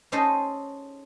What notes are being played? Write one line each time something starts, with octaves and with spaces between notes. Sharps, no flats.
C#4 D#4 G#4 A4 C5 D#5